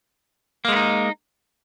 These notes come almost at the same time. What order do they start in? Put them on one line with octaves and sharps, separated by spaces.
A#3 G#3 B3 D#4